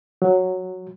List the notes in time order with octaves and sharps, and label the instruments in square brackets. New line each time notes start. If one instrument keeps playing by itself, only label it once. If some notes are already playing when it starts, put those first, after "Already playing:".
[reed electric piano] F#3